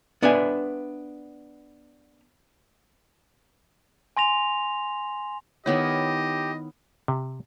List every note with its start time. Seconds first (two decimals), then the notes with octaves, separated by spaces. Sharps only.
0.22 B3 D4 B4 E5 G#5
4.17 G#5 C6 A#6 F7
5.66 D#3 B3 E4 G4 C#5 D#5
7.08 C3